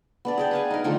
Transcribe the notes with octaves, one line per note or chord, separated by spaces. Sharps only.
B3 D4 D5
G#4 D5 G5
B4 F5 G#5
D#4 A#4
D3 D#3 F3 A3